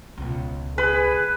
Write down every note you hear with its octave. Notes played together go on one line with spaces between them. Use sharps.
C#2 B2
G#4 B4